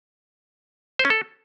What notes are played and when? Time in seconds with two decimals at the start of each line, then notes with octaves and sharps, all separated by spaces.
0.99 C5
1.05 C#4
1.10 A4